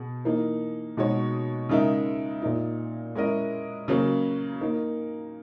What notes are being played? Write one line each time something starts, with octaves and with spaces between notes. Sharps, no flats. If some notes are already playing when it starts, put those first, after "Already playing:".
Already playing: B2 G#4
E3 A#3 D#4
B2 G#3 D#4 F#4 C#5
C#3 G#3 D#4 A#4 E5
A#2 A#3 D#4
G#3 C#4 E4 A#4 D#5
C#3 F#3 A#3 C#4
A#3 D#4 A#4